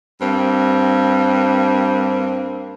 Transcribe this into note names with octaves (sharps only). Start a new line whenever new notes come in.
G2 A#3 C4